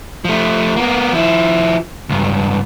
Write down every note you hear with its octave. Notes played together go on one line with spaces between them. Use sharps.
F3 A3
A#3 B3
F3 E4
C#2 G2